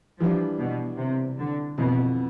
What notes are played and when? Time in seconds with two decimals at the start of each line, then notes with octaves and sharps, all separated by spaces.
0.19 E3 F3 G3 D4
0.59 B2
0.98 C3
1.39 D3
1.78 F2 B2 E3 B3